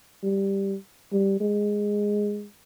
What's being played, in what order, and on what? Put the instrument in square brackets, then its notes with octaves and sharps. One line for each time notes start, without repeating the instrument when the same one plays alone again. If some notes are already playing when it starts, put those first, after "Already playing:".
[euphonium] G3
G3
G#3